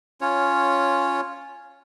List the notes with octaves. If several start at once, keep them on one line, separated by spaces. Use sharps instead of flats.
C#4 F4 C#5